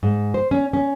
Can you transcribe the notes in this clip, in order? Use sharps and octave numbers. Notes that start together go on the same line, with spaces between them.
G#2
C5
C#4
C#4